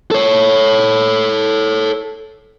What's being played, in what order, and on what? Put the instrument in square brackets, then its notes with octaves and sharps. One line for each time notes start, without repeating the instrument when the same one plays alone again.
[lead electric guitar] A4 C#5